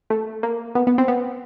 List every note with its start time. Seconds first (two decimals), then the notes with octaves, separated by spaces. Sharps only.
0.10 A3
0.43 A#3
0.75 B3
0.87 B3
0.98 C4
1.08 B3